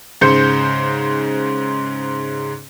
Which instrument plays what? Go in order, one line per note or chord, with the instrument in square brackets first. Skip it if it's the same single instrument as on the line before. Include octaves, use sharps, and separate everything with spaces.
[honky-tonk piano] G#2 C#3 C5 G6 C#7